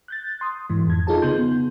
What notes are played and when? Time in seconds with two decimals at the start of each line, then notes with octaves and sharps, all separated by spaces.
0.08 F#6 G6 A6
0.41 C6 D#6
0.70 G#2 E3
0.87 F2 G#6
1.07 D#4 F4 G#4 A4 A5
1.22 C#3 B3 D#4 C6 G6